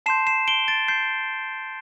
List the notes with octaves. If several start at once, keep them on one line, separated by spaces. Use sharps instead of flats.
A5 C6 G6 C7 E7
C7 E7
D7 G7
A6 D7
G6 C7